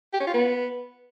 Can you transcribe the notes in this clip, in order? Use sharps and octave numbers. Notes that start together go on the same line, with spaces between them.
G4
C#4
F4
B3